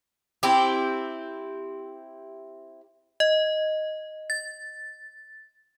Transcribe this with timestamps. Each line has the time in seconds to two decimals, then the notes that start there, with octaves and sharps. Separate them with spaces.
0.43 C4 E4 G4
3.20 D#5
4.30 A6